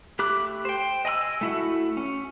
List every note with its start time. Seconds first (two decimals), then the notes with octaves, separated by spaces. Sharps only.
0.19 A3 G4 B5 D6 F#6
0.65 C5 G5
1.05 D#5 G#5 B5 E6
1.41 A3 E4 F#4
1.97 C#4